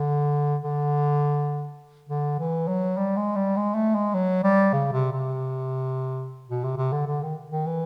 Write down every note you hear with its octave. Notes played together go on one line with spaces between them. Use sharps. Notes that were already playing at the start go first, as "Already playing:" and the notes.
Already playing: D3
D3
D3
E3
F#3
G3
G#3
G3
G#3
A3
G#3
F#3
G3
C#3
C3
C3
B2
C3
C3
D3
D3
D#3
D#3
E3